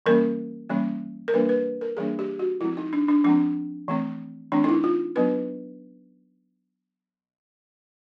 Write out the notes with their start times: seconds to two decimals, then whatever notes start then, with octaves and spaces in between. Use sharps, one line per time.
0.06 E3 G3 A#3 C#4 A#4
0.69 E3 G3 A#3 C#4
1.28 A#4
1.34 E3 G3 A#3 D4 B4
1.49 B4
1.81 A#4
1.97 E3 G3 A#3 D4 G#4
2.19 G4
2.39 F#4
2.61 F3 G#3 C4 E4
2.77 D#4
2.93 D4
3.09 D4
3.24 F3 G#3 C4 D4
3.88 E3 A3 C4
4.52 E3 A3 C4 D4
4.64 D#4
4.69 E4
4.84 F4
5.16 F#3 B3 D4 B4